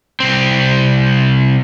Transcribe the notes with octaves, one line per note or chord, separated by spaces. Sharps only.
C2 C4